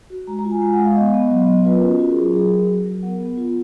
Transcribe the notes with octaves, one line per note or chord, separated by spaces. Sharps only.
F#4
G#3 A#5
A#5
F4
G#5
G#3 G#5
F#5
G#3
F5
B3 D#5
B3
F#3
B3
F4 B4
A#4
C#4
F#4
F4 F#4
G#4
F#3
A#4
F#3 G#4
F#3 G#4
F#4 A#4
F#3
B3 F#5
B3
F4